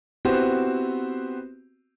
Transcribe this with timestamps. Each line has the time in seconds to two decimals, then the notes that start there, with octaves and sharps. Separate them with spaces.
0.25 B3 C4 E4 F#4 G4 C5